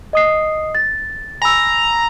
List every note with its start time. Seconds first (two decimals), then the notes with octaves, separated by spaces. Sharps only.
0.13 D#5 D#6 C7
0.75 A6
1.42 G#5 A#5 B5 E6